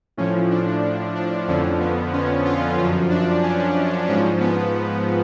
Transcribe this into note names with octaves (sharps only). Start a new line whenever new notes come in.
A2 F3 C#4
D4
D4
F2 D3 F3 C#4
B3
C#4
F4
F#2 F3
D4
C#4
G#2 F3 C#4
B3